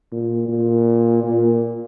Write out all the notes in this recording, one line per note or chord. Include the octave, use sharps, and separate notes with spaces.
A#2
A#2
A#2